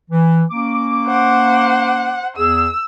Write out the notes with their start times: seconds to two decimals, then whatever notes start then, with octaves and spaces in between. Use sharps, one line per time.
0.11 E3
0.51 A#3 C#4 D6
1.06 C5 F#5
2.37 E2 G#4 E6